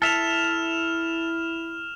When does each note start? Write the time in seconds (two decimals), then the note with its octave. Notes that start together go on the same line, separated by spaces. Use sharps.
0.02 E4 A4 E5 F6 E7 F7